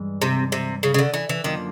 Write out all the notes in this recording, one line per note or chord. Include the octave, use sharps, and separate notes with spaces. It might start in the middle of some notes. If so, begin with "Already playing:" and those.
Already playing: G2 E3 G#3
C3
C3
C#3
C#3
D3
E3
E3
F#2 D3 D#3 F3 A#3